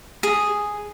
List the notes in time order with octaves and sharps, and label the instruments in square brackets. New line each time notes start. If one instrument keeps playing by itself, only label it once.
[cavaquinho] G#4